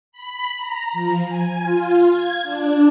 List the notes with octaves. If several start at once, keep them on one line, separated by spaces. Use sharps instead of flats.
B5
A#5
F3
G#5
F4
G#6
D4